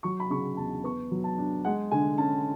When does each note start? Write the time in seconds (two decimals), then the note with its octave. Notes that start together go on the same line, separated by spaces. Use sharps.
0.03 F#3 C#6
0.20 B5
0.30 C#3 C#6
0.57 E2 A5
0.84 B3 C#6
1.11 F#3
1.24 A5
1.38 D4
1.65 G#3 F#5
1.91 D3 G#5
2.18 C#4 A5